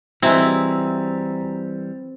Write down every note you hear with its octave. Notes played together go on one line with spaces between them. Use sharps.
E3 G3 G#3 C4 E4 F#4 G#5 A#5